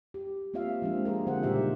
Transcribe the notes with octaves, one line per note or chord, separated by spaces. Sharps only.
G4
A#3 C4 F4 E5 F5
F3 G#3 A#3 C4 D4
F4 G#4 A#4
D3 G3 C4 D4 C5 F#5
A#2 C#3 D#4 G4 E5